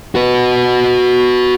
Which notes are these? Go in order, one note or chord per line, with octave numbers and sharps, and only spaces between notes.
F#4 B4